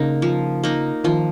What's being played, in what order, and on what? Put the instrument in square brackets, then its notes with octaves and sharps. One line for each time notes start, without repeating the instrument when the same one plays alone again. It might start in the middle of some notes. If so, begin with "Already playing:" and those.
Already playing: [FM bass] C#3 [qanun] A#3 D#4
[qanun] F3
A#3 D#4
[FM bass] D#3 [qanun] F3